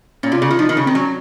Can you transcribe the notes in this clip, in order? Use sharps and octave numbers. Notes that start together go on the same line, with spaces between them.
A#2 C#4
C3 F4
C#3
D#3 F4
F3 D#4
D#3
C#3
D#3 C4
F#3 C#4